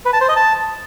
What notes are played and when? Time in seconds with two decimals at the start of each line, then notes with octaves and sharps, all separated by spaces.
0.06 B4
0.13 A5
0.21 C5
0.29 D#5
0.36 A5